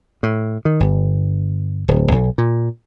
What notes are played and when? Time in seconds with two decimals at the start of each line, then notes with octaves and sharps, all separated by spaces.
0.23 A2
0.65 D#3
0.80 G1
1.88 D1
2.11 B1
2.38 A#2